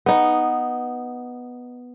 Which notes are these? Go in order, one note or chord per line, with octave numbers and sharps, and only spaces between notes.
B3 D#4